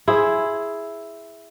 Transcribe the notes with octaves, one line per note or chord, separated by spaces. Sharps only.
E4 G#4 C5